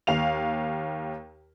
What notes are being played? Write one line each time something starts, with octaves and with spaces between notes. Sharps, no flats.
D#2 F5 F7